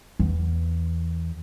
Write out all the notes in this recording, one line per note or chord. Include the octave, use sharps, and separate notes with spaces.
E2